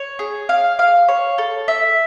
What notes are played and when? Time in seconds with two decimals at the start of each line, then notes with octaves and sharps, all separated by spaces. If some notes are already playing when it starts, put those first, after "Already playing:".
Already playing: C#5
0.19 G#4
0.49 F5
0.79 F5
1.08 C#5
1.38 A4
1.68 E5